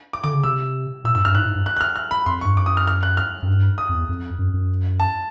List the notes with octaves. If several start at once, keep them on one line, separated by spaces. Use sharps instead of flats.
D6
D3 D6
C#3
C3 E6
A#2 E6
G2 E6
F#2 F6
G2
G#2 F#6
G#2
G2
F#6
F#6
F6
F6
B5
F2 C6
C#6
G2
F#2 D6
D#6
F6
F6
F#6
F6
F#2
G2
D#6
F2
E2
F2
F#2
F#2
A5